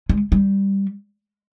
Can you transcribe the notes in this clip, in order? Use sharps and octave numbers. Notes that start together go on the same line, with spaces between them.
G#3
G3